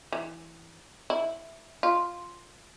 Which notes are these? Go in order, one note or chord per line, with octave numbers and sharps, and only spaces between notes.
E3
E4
F4